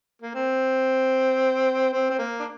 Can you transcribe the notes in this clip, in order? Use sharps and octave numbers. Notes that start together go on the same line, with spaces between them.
A#3
C4
C4
C4
A#3
D4